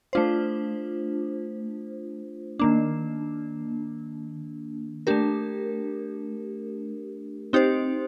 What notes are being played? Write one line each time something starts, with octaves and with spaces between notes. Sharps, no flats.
A3 D4 F4 C5
D#3 A#3 D4
A3 D4 G4 A#4
C4 D#4 G4 C5